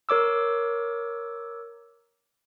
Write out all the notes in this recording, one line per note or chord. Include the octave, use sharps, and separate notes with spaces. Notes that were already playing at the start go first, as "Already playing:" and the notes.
A#4 C#5 D6 E6